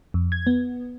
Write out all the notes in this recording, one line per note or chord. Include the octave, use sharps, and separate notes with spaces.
F2
G#6
B3